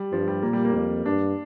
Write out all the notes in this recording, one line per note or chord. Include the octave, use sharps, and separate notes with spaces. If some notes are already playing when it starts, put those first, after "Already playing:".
Already playing: G3
G2 F3
G3
A#2 A#3
G3
A#3
F2
G2 D4